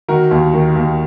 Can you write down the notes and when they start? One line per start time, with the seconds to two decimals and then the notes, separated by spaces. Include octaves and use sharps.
0.08 D#3 F#4 A#4
0.31 D#2
0.53 D#3
0.76 D#2